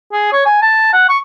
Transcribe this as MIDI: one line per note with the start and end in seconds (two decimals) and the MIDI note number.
0.13 0.27 68
0.33 0.42 73
0.46 0.57 80
0.62 0.88 81
0.93 1.06 78
1.09 1.19 85